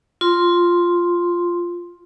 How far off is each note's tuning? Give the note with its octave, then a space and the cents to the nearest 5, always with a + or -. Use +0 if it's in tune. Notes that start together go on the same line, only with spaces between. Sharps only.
F4 +0 C6 +0